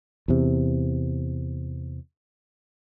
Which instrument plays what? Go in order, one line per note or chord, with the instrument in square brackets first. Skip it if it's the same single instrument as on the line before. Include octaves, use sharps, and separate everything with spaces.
[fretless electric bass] E2 C3